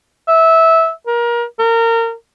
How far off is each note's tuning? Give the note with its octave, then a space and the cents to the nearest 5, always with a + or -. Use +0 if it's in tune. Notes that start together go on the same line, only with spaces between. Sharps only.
E5 -15
A#4 +25
A#4 -25